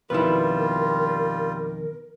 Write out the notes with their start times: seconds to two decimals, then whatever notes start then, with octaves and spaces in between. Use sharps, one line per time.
0.10 F2 B2 D#3 G3 E4 F4 A#4 B4